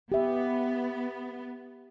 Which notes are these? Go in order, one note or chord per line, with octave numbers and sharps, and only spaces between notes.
B3 G4 E5